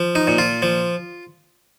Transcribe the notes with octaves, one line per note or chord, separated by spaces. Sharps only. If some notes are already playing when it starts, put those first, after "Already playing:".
Already playing: F3
D#4
A#2
F4
F3